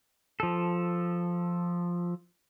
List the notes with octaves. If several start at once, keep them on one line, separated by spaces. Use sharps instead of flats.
F3 A4